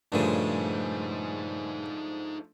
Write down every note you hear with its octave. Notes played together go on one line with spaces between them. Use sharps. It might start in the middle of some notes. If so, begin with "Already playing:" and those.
G2 A#2 C#3 F3 A3 D4 D#4 C5